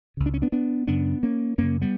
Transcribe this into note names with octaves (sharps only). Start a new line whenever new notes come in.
C#2 C#3
D4
C#4
B3 D4
B3 D4
F#2 C#3 B3 D4
A#3 C#4
F#2 C#3 A#3 C#4
G3 B3